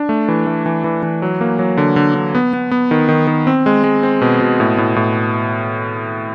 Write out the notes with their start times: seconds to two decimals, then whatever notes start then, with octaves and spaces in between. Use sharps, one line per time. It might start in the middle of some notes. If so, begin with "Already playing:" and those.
Already playing: D4
0.09 A3
0.28 E3
0.47 A3
0.66 E3
0.84 E3
1.03 E3
1.22 F#3
1.41 A#3
1.59 F#3
1.77 D3
1.96 D3
2.15 D3
2.35 B3
2.53 B3
2.71 B3
2.91 D#3
3.09 D#3
3.27 D#3
3.47 C4
3.66 G#3
3.84 G#3
4.03 C4
4.21 B2
4.41 B2
4.60 A2
4.78 A2
4.96 A2